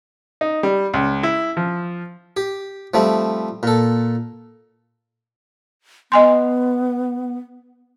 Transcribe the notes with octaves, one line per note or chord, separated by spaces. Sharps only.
D#4
G3
C#2
E4
F3
G4
F3 G3 A3 C4
A#2 A4
B3 D#5 G#5 C6